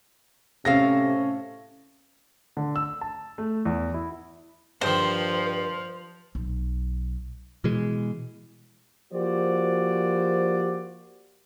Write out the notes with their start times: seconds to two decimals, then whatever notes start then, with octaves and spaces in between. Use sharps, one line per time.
0.65 A2 C3 C#4 A4 F5 A#6
2.57 D3
2.76 E6
3.01 A5
3.38 A3
3.65 E2
3.94 E4
4.81 G2 D#3 F3 B4 C5
6.35 B1
7.64 B2 E3 G#3
9.13 F3 A#3 F#4 G4 C5 D5